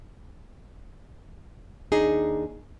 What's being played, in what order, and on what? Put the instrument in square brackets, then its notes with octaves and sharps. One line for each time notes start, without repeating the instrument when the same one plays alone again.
[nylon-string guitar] D#2 D4 D#4 G#4